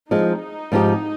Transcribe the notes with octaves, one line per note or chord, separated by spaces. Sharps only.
F3 G#3 C4 D#4
G#2 F3 C4 G4